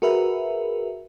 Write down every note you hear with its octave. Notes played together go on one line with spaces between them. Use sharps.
F#4 G#4 A#4 B4 E5